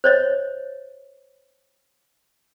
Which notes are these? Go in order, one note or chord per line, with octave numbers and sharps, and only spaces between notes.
C5 C#5 D#5